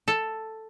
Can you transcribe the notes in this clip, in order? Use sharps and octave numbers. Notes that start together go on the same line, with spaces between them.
A4